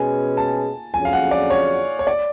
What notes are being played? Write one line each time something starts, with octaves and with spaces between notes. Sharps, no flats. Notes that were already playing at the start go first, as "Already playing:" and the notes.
Already playing: B2 G#3 C#4 G#4 B4 G#5
A5
F2 D3 F#3 C#4 G#4 G#5
F5
F#5
D5
C#5
C#5
D5